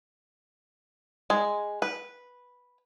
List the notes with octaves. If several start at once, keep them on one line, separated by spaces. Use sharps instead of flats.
G#3
B4